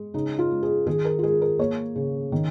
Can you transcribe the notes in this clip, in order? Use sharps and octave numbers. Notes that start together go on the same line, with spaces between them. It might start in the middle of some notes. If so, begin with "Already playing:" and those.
Already playing: G#3
C#3 D#4
F4
G#3
G#4
D#3 G#4
A#4
F4
G#3 G#4
A#4
A#3 C#5
C#3
D#3